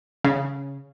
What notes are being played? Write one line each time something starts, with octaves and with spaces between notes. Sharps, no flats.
C#3